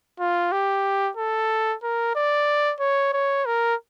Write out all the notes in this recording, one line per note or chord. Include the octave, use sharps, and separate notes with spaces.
F4
G4
A4
A#4
D5
C#5
C#5
A#4